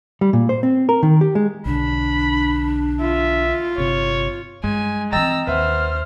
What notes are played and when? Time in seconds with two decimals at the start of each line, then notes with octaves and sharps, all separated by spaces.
0.21 G3
0.33 A#2
0.49 C5
0.63 C4
0.89 A#4
1.03 D#3
1.21 G4
1.35 G#3
1.66 B1 D3 D4 B5
3.00 F4 E5
3.78 G1 C3 C#5
4.64 G2 G#3 G#5
5.13 E3 C4 D#5 G5 A#5 E6 A6
5.47 D#2 B4 C5 E5 F#5 F6